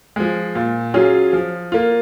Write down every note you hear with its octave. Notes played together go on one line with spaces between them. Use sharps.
F3 G#3
A#2
F#3 C#4 F4 G#4
F3
A#3 F4